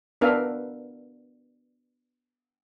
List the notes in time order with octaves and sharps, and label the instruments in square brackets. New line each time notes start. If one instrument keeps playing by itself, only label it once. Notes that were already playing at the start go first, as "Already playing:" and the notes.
[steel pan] B3 D4 A#4 E5 F5